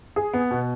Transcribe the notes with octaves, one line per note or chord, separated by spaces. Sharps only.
G#4
B3
B2